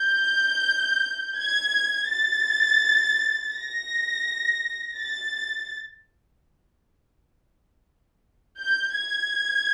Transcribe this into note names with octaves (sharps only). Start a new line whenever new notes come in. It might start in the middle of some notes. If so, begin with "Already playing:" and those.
Already playing: G6
G#6
A6
A#6
A6
G6
G#6